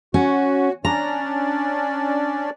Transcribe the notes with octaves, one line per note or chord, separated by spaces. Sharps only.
C#4 F#4
C#4 D4 D5 A#5